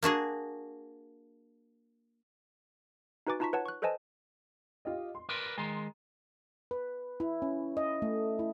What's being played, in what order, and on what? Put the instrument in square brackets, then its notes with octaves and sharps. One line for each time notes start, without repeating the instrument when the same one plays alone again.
[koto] A#3 D4 F#4 G#4
[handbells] D#4 F#4 B4 G#5 D6 A6
D#4 F4 A5 A#5 C#6 B6
B4 C#5 F#5 A5
C#6 F#6
A4 B4 C5 D#5 G#5 A5
[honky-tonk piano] F4 G4 D#5
C6
[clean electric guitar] A#4 B4 D5
[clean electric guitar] D#3 G#3 [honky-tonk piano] A#5 C6
[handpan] B4
E4
C#4
D#5
A3
E4